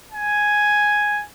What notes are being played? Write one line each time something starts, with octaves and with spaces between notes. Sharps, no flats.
G#5